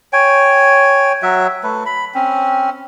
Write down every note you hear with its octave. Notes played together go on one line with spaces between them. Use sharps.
C#5 G5 G#5
F#3 F#4 E5
A3 B4
B5
C4 C#4